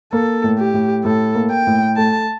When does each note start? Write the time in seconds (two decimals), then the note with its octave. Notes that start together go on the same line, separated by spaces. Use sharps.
0.13 A#3 A4
0.44 A2
0.59 G4
0.74 A2
1.04 A2 A4
1.35 A#3
1.51 G5
1.67 A2
1.97 A3 A5